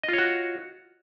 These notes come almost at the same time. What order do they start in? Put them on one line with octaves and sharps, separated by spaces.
D#5 F4 C#5 F#4